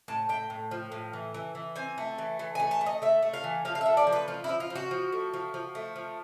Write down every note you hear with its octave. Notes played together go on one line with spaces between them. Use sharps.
A2 A5
A2 G5
A2
F3
A2
E3
E3
E3
C4 G#5
A3
E3
E3
A3 G#5
A5
A3
D#5
A3 E5
A3
F5
E3
F3 F5
F5
A3 E5
D5
F3
B4
F3 F4
F3 E4
F4
F3
F#4
F3
A3
F3
F3
A3
F3